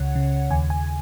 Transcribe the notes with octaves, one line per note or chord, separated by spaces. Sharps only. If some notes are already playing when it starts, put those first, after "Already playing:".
Already playing: C#2 C#3 C#5 F#5
C#3
D#2 G#5
G#5